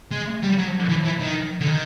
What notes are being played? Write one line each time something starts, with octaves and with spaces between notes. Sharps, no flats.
G#3
G3
F#3
E3
E3
D#3
D3
D#3